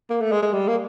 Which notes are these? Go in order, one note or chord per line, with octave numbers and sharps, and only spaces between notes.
A#3
A3
G#3
G#3
G3
A#3